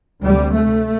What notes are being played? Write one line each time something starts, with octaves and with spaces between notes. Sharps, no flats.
D2 C3 G3
A3